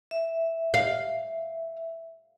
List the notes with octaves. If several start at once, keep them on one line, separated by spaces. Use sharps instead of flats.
E5
F5